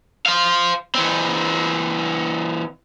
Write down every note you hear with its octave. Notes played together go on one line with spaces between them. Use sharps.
C5 F5
E3 C4